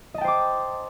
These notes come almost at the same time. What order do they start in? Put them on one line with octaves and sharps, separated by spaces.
D#5 A5 G5 C5 D6